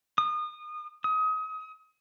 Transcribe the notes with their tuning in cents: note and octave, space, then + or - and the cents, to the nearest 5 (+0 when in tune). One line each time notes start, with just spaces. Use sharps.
D#6 -30
D#6 +30